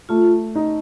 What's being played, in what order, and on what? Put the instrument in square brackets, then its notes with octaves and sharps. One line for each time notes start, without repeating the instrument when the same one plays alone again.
[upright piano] A3 [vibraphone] F4
[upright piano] D#4